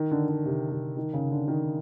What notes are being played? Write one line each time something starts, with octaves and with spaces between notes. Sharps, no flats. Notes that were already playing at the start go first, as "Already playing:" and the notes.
Already playing: D#3
D3
D3
C3
C3
D#3
C#3
D3
D#3